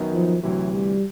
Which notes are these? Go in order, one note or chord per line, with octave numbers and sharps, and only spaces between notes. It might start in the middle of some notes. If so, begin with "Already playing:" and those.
Already playing: F#2 D#3 F#3 B3 D#4
F3
D2 C3 E3 F#3
G3